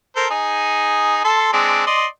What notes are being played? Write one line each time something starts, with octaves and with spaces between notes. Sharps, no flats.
A4 A#4 C5
D#4 G#4
A4 A5 C6
G#3 C4 D4
D5 D#5 C6